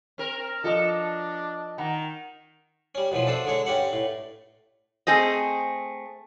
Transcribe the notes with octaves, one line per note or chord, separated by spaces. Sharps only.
C4 A#4
F3 D4 A4 A#4 D#5
D#3 F#5 A#5
G3 C#4
F#2 B2 E3 F3
D4 A4 C5
D3 G#3 C#5
G2 C#4 G4 F#5
A2
A3 C4 G#4 C5 D#5